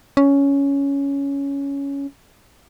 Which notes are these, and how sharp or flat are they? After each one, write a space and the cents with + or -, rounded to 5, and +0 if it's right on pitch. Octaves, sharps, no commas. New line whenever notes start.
C#4 +10